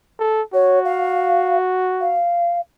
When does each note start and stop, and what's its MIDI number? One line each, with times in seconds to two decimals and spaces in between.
0.19 0.42 69
0.54 2.21 66
0.54 0.79 73
0.85 1.56 77
2.01 2.58 77